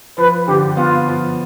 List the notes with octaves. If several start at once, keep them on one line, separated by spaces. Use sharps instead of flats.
F3 B4
D3 G4
B3 F4
F3